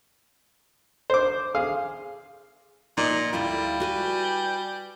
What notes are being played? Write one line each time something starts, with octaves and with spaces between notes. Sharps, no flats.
C5 D6
G#4 F5
A#2 D#4
D2 G3 E4 F4
F#4 B4 G#5